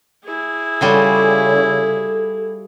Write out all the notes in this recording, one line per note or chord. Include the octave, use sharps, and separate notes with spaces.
E4 G#4
C#3 G3 F4 F#4 A4